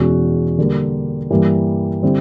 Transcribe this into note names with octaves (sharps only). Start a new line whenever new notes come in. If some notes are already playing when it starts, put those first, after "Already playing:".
Already playing: E2 B2 G#3 C#4 F#4
D3 G3 A#3
G2 E3 G3 A#3
D3 G3 C4 E4